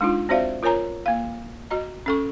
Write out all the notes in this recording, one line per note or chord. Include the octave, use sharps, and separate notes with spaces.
G#3 D4 D#4 F4
C4 F#4 C5 D5 E5 F5
F4 A#4 C#5 G#5 A#5
A#3 F5
F#4 D#5 A#5
C#4 A4 C#6